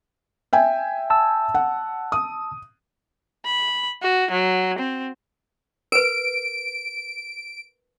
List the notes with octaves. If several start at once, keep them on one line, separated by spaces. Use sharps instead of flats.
E5 G5 G#5
A5 E6
F#5
D#6
B5
F#4
F#3
C4
A#4 B4 D7